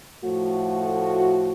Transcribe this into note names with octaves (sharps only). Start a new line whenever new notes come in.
A2 F3 A3 F#4